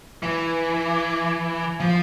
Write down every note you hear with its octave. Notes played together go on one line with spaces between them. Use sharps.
E3
F3